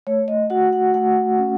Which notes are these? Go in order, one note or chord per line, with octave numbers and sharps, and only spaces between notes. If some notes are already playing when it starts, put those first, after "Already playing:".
A3 C#5
D#5
F#4 F#5
F#5
A3 F#5
C#4